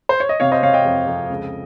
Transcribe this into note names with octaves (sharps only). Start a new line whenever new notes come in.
C5
C#5
D#5
C3 C#5 F5
C5 D#5
C3 C#5 F5
D#5 G5
F2
F2
C#2